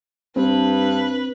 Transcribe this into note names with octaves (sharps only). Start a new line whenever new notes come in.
G2 C4 D4 B4